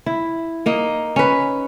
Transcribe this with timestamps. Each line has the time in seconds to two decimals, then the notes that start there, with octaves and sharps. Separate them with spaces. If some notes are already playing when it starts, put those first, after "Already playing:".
0.06 E4
0.66 A#3 D#4
1.16 C#4 B4